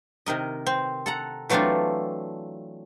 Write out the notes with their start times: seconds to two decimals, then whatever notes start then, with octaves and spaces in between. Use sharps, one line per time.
0.26 C3 D#3 A#4 D#5
0.67 C4
1.06 A4 F#5 A#5
1.50 E3 F#3 A3 C4 D4 F4